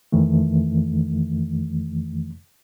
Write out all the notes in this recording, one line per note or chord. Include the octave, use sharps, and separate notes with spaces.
F2 D#3 E3 A3